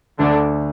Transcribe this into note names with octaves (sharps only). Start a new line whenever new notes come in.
D2 D3 D4